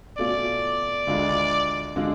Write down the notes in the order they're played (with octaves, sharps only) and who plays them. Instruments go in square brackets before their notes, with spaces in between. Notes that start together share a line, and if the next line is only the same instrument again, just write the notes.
[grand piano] B2 A3 C#4 F4 [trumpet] D5
[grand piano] D2 D3 G#3 D4 F4
D3 G#3 D4 F4